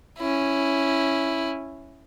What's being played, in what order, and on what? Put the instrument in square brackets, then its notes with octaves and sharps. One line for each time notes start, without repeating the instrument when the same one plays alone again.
[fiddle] C#4 E4